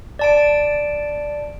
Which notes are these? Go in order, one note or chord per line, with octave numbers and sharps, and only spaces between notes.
D5 A5 D7